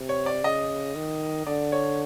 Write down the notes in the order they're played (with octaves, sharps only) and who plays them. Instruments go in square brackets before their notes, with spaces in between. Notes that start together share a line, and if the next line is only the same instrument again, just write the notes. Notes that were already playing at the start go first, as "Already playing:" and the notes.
Already playing: [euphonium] C3
[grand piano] C#5
D5
[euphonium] C#3 [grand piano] D#5
[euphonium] D#3
[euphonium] D3 [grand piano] D5
[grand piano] C#5